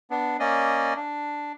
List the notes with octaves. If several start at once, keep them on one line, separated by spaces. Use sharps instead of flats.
B3 D4
A#3 C#4 D5 D#5
D4